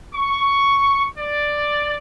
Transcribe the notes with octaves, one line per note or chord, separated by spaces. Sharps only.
C#6
D5